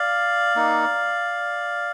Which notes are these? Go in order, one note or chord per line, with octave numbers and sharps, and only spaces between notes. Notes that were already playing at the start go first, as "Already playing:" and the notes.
Already playing: D5 F5
A#3 D#4